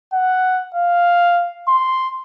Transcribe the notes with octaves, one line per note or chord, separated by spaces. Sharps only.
F#5
F5
C6